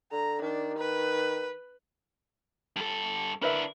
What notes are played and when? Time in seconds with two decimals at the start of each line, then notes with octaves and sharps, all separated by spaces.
0.12 D3 A#5
0.42 D#3 D4
0.78 B4
2.76 G2 A4
3.42 D4 E4 A#4 B4 E5